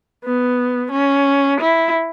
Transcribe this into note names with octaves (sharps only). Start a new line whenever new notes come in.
B3
C#4
E4